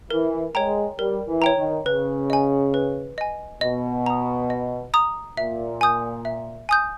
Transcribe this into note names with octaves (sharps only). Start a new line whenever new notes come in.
E3 A#4
G#3 C#5 G5 A#5
G3 A#4
E3
C#5 G5 A#5
D#3
C#3 B4
D#5 G#5
B4
D#5 G#5
B2 D#5
A#5 D#6
D#5
A#5 D#6
A#2 E5
G#5 D#6 G6
E5
G#5 D#6 G6